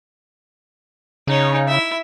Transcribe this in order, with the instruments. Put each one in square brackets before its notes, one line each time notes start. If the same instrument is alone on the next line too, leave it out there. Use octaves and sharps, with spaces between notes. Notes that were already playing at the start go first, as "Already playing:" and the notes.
[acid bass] C#3 [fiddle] D#4 C#5
[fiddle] E4 E5